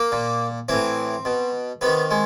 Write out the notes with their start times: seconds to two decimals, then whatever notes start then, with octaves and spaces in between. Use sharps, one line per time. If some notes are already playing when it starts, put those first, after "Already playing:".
Already playing: A#3
0.12 A#2
0.69 A2 E3 C4
1.25 B2
1.81 C3 D#3 B3
2.11 G#3